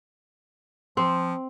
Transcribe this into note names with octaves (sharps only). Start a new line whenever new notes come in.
F3 C4